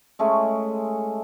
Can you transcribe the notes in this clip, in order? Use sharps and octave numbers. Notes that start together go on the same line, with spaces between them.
G#3 A3 C#4 G#4